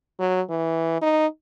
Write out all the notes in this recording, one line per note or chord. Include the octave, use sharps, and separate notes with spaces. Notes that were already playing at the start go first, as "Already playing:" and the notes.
F#3
E3
D#4